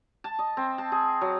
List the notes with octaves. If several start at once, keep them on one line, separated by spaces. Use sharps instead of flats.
A5
D#5
C4
A5
G#4
F#3